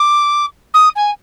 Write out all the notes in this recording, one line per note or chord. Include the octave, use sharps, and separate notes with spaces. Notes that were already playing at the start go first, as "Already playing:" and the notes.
Already playing: D6
D#6
G#5